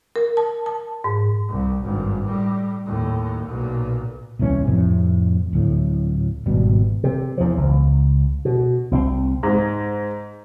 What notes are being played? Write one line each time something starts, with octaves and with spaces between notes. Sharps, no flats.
A#4
A5
A5
G#2
C2
G#1 G2
A2 G3
D#2 A2
B1 A#2
D#1 C2 E3 C#4
F2 A2 C3
D1 A2
G#1 B2 G3
C3
E2 F3
C#2
B2
C2 G#3 C4
G#2